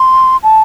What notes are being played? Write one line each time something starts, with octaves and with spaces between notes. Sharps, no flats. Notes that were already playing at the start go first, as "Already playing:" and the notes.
Already playing: C6
A5